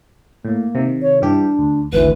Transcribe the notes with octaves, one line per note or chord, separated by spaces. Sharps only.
A2 A#3
C3 D#3
C#5
G2 E3 D4 G4
D2
G#1 D2 E3 B4